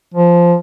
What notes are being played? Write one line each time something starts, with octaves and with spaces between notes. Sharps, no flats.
F3